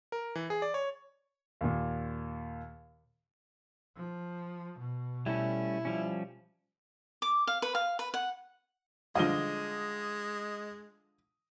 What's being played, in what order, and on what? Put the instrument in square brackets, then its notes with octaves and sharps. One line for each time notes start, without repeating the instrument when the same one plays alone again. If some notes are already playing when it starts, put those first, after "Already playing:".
[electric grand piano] A#4
E3
G#4
D5
C#5
[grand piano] D#2 A#2
[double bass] F3
B2
[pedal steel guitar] G3 A3 C#4 [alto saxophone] E4
[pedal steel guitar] F3 G3 C#4
[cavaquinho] D6
F5
B4
F5
B4
F#5
[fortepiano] D3 F3 G3 [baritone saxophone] G#3 [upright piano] D#5 G7